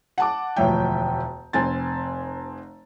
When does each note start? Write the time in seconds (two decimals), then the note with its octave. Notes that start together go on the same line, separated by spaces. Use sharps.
0.18 F#5 A5 D6
0.56 E1 D2 F3 C#5 E5 G5
1.53 F1 C4 G#5 A6